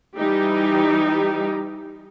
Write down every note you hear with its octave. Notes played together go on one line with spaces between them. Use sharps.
E3 G3 D#4 G4